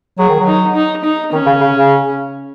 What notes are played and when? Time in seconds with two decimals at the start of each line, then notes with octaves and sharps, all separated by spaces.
0.18 F#3 G#4
0.29 D#3
0.39 F#3
0.46 D#4
0.75 D#4
1.04 D#4
1.32 D#3 C#4
1.46 C#3
1.61 C#3
1.75 C#3